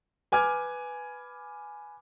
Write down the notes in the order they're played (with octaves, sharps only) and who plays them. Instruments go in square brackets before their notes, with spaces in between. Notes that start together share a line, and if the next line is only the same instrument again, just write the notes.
[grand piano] B4 G#5 D6 F6 G#6